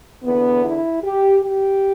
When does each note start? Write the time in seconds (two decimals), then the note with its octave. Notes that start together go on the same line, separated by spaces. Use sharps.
0.24 E2 D3 B3
0.63 E4
1.02 G4
1.42 G4